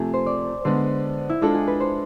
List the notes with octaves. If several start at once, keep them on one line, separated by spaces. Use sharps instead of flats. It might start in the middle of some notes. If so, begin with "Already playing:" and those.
Already playing: C3 F3 A3 G#4
C5
D5
D3 G#3 B3 C5
E4
G#3 D4 F4 A4
G#4
B4
C5